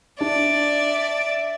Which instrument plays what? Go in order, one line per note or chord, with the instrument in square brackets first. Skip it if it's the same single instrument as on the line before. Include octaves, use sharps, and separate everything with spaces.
[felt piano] D4 [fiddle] D5 [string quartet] E5